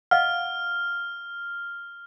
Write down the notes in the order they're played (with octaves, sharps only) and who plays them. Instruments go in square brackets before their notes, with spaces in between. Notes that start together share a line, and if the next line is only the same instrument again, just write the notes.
[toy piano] D#5 F5 F#5 [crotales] F6